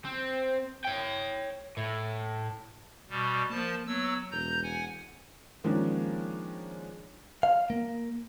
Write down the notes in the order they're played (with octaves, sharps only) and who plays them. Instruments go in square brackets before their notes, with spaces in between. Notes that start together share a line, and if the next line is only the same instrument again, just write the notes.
[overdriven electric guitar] C4
C#5 G5
A2
[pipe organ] B2 G3
[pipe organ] F3 A5 [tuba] A#3
[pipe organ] F#3 E6 [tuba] B3
[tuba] E1 [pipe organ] A#5 G6
[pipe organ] F#5 G#5
[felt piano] D#3 F3 G#3 A#3 C#4 D4
[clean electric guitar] F5
A#3